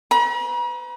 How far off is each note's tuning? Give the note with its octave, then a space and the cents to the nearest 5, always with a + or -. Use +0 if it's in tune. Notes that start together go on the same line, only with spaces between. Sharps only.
B4 +40 A#5 +45